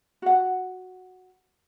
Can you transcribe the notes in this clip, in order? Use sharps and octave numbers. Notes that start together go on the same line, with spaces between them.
F#4 F#5